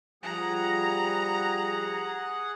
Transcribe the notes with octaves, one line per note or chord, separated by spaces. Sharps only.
F3 G3 G#4 F#5 A#5